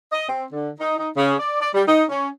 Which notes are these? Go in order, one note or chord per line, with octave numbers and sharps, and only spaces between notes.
D#5
C4
D3
D#4
D#4
C#3
D5
D5
G3
D#4
C#4